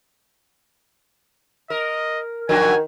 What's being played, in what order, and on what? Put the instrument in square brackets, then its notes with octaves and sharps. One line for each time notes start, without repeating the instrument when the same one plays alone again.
[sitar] A#4 [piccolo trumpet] D#5
[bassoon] D#3 [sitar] F3 D4 F#4 [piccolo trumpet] G#5